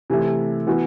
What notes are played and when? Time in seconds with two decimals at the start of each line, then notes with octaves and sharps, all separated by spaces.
0.10 C3 E3 A3 E4
0.67 E3 B3 F#4